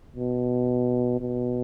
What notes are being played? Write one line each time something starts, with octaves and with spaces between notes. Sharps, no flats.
B2
B2